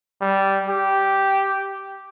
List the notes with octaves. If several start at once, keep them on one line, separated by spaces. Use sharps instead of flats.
G3
G4